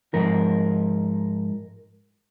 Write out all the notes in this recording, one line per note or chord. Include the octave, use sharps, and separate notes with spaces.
G#2 F3 A#4